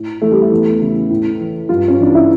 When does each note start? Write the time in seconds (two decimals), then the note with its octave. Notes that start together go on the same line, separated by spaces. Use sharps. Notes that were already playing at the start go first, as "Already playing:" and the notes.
Already playing: A2
0.22 E3 A3
0.31 G3
0.42 A3
0.52 E2
0.81 C#3 E3
1.10 A2
1.40 E3
1.69 G2 F4
1.88 C#4
1.99 E3 D4
2.15 E4